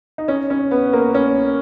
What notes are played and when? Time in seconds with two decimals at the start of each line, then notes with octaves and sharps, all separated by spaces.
0.18 D#4
0.28 C#4
0.50 C#4
0.71 B3
0.93 A#3
1.15 C#4